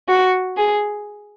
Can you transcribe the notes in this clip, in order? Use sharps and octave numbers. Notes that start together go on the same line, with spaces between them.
F#4
G#4